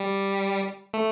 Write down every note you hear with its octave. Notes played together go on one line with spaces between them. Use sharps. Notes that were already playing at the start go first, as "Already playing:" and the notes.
Already playing: G3
A3